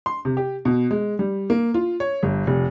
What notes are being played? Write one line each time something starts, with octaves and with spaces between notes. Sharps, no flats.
C6
C3
G4
B2
G#3
G3
A#3
F4
C#5
G1
F1